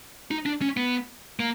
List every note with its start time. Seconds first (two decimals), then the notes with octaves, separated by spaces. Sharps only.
0.31 D#4
0.46 D4
0.62 C#4
0.77 B3
1.39 A#3